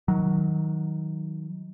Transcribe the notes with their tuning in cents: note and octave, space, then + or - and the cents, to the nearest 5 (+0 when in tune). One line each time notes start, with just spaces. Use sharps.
D#3 +20 F#3 +0